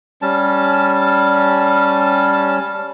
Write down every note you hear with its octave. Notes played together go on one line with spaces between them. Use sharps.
G3 C#4 A5